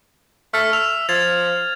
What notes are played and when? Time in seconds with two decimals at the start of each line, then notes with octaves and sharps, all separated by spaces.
0.54 A3 F6
0.73 E5 F7
1.09 F3 G#6 A6 F7